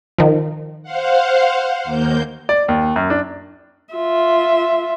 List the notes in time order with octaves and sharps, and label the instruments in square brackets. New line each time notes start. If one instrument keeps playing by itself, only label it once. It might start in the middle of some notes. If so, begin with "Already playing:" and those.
[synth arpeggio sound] D#3 F3
[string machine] C5 F5 F#5
D#2 A#3 G6
[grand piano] D5
D#2
F#2
D4
[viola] F4 E5